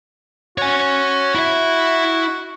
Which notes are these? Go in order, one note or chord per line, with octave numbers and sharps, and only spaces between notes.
F#4 C#5 G#5
E4 E5